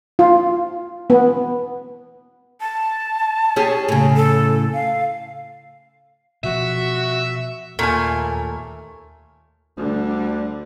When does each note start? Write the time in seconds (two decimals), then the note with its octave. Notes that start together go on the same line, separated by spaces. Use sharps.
0.19 F4
1.10 B3
2.61 A5
3.56 C#4 G4 G#4
3.89 A2 C#3
4.16 A4
4.74 F5
6.44 B2 F3 F#4 E5
7.79 D#2 A#2 A3 A#4 G#5
9.77 D2 D3 G3